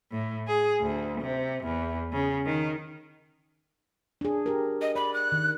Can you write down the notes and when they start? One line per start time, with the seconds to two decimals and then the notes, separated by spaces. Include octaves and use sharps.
0.12 A2
0.48 G#4
0.81 D2
1.21 C3
1.64 E2
2.12 C#3
2.46 D#3
4.21 D4 G#4
4.46 G4 A#4
4.82 D#5
4.95 D5 B5
5.14 F#6
5.32 D#3